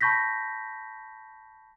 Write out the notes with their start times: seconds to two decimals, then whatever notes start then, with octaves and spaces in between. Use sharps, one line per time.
0.01 A5 B5 C#6 G6 A#6 B6